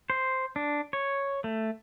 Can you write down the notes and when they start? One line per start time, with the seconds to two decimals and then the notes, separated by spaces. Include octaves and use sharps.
0.10 C5
0.56 D4
0.93 C#5
1.44 A3